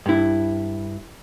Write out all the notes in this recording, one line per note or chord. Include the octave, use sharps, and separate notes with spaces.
G2 E4